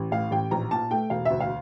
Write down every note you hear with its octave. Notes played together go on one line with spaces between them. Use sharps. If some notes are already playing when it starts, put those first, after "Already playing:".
Already playing: A1
A2 F5
A1 G5
A#1 A#5
A#2 A5
A3 G5
E1 F5
D2 E5
F5